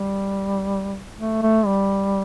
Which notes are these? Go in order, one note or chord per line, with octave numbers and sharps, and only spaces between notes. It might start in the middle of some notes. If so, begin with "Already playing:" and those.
Already playing: G3
A3
A3
G3